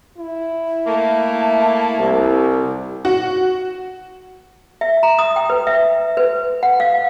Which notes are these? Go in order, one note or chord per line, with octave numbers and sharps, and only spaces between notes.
E4
A3 A#3 A5
C2 G4
F#4
E5
A#5
D#6
G5
B4
E5
B4
F#5
F5